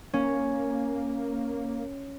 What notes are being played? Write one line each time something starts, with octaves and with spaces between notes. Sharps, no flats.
A#3 C#4